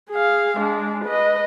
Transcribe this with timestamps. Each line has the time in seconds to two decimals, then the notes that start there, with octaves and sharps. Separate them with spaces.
0.11 G#4 F5
0.58 G#3 D4
1.05 B4 D#5